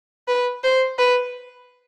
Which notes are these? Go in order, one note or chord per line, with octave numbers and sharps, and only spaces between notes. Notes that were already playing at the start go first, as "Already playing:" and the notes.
B4
C5
B4